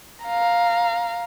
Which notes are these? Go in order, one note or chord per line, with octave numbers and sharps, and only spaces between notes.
F5 A#5